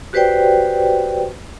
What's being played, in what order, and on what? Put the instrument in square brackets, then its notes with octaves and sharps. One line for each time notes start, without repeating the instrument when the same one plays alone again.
[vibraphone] F#4 G4 B4 C5 D5 G5